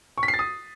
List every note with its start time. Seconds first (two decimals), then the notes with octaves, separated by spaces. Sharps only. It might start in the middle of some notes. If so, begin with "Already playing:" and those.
0.18 C#6
0.23 B6
0.28 C7
0.34 A6
0.39 D#6